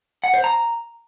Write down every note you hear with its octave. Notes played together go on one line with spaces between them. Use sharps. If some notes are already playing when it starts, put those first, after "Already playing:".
F#5
C5
A#5